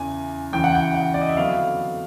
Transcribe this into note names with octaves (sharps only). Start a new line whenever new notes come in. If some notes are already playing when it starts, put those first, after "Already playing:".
Already playing: E2 C#3 E3 G#5
E2 C#3 E3 G5
F#5
G5
F#5
D5
D#5
E5
F2 D3 F#3 B3 F5